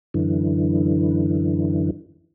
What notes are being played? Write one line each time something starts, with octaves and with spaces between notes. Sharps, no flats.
F#2 D3 E3